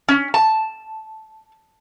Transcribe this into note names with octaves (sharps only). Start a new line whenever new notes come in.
C#4
A5